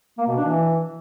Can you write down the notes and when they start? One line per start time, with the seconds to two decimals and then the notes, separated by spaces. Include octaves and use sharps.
0.18 A#3
0.28 B2
0.37 D4
0.46 E3